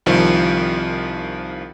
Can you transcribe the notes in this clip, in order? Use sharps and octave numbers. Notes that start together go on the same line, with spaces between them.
C2 D#3 F3